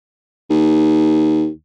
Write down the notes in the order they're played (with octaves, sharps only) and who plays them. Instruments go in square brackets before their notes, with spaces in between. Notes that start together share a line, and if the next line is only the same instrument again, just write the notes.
[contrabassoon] D#2